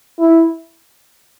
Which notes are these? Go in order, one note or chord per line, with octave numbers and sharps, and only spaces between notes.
E4